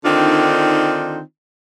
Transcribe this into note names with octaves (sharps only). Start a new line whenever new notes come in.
D3 D#3 C4 D4 D#4 F4